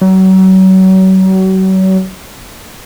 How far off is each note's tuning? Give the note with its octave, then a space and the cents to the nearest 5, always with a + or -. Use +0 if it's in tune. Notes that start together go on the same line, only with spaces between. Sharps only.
F#3 +35